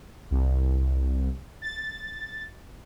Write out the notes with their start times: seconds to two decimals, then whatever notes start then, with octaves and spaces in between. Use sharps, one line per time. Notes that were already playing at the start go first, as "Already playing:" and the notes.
0.31 C2
1.62 A6